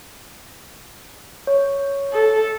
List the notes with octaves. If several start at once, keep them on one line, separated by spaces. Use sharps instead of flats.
C#5
A4